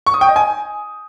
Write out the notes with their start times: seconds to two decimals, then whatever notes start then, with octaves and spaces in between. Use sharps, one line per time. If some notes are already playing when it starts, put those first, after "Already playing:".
0.06 C#6
0.14 D#6
0.21 G5
0.29 D#5
0.36 G#5